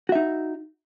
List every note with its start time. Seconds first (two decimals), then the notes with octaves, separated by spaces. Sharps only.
0.09 F#4
0.12 E5
0.15 D#4